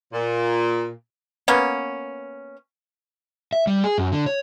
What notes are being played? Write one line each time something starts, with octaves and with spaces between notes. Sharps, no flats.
A#2
A#3 B3 C#4
E5
G3
G#4
F#2
D3
C#5